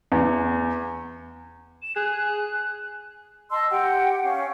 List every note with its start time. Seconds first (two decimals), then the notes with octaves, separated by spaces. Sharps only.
0.12 E2
1.82 E7
1.96 G#4 F#6
3.51 D#5 A5 C6 E6
3.70 G4 F#5 G5
4.23 C#4 F5